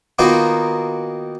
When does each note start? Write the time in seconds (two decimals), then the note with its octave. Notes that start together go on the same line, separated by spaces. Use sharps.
0.19 D#3 A#3 B3 D#4 F4 F#4